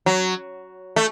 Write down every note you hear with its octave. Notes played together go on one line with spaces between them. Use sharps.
F#3
A3